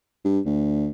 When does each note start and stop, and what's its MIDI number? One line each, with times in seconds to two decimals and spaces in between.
0.25 0.40 43
0.46 0.90 38